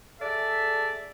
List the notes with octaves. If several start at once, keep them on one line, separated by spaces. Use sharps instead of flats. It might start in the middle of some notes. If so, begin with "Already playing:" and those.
G#4 A4 D5 E5